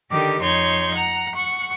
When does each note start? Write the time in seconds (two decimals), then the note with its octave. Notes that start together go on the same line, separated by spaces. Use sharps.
0.11 D3 D#3 G4 D6
0.41 F2 D#4 C#5 C6 G6 G#6
0.95 F#5 A#5
1.35 F#5 C#6